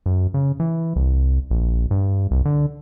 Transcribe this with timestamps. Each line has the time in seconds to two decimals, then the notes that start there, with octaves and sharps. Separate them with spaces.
0.06 F#2
0.34 C#3
0.60 E3
0.96 C2
1.51 A#1
1.91 G2
2.31 C2
2.45 D3